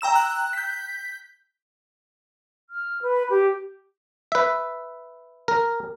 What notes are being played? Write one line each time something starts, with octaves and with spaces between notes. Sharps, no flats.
G5 A#5 E6 E7
F#6
G6 B6
F6
B4
G4
B4 E5
A#4